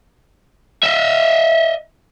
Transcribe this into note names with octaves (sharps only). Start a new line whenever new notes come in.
D#5 E5